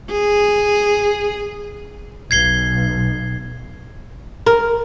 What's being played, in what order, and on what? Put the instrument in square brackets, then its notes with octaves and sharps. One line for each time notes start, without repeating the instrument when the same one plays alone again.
[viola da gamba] G#4
[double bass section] B1 [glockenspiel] G#6 C7 G7
[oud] A#4